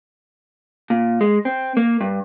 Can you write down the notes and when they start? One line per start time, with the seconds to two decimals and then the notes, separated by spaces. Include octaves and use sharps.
0.90 A#2
1.21 G#3
1.45 C4
1.77 A#3
2.01 G2